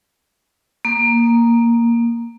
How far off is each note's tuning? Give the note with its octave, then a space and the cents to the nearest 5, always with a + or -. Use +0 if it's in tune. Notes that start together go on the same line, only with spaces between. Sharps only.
A#3 +0